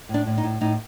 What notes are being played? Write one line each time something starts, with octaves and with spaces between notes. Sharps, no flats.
A2 D4
A2
D#4
A2
A2 D#4